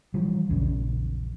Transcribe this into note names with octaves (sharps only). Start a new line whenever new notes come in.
E3 F3 G3
A#1 E2 C#3